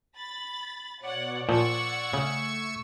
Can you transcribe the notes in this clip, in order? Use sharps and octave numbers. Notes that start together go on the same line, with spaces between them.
B5 A6
B2 C#5 D5 F#5
A#2 F3 F#5 C#6 E6 G#6
C#3 A3